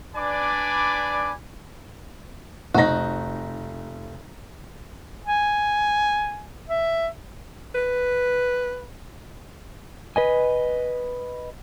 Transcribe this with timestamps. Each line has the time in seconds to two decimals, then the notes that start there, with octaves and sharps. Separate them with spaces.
0.16 D4 B4 D5 G#5 B5 D6
2.74 F1 D#4 F#4 A#6
5.26 G#5
6.69 E5
7.75 B4
10.16 B4 D#5 G#5